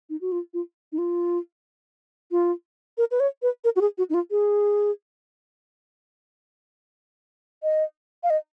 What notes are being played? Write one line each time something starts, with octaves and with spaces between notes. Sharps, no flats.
D#4
F#4
F4
F4
D#4
F4
F4
A#4
B4
C#5
B4
A#4
F#4
G#4
F#4
D#4
F4
G#4
D#5
F5
D#5